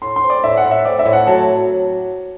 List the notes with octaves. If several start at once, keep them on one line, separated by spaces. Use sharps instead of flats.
A2 C6
C6
C4
D5
A2 E5
F#5
A2
E5
C4 D5
E5
A2
F#5
F#3 A5